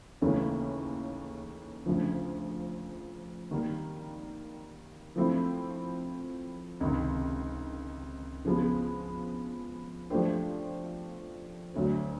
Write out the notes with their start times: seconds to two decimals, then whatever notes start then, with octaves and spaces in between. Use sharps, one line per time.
0.21 D#2 C#3 E3 A3 C#4
1.86 D2 C#3 F3
3.51 D#3 G3 A#3
5.16 F3 A3 C4 E4
6.81 C#2 C3 D#3
8.45 C#3 F3 G#3 B3
10.10 F3 A3 D4 G4 C5
11.74 D2 D3 F#3